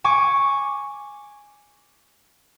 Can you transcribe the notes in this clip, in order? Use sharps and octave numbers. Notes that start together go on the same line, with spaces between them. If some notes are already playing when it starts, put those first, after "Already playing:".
G#5 C#6 D6